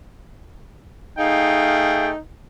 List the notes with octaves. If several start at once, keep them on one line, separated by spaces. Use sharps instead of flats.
A3 D#4 G#4 F5 G5